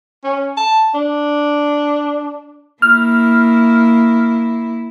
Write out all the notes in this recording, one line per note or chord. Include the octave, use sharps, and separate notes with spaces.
C#4
A5
D4
A#3 E4 F6